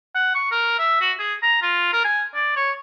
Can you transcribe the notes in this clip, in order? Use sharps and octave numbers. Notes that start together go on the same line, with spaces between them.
F#5
C#6
A#4
E5
F#4
G#4
A#5
F4
A#4
G#5
D5
C#5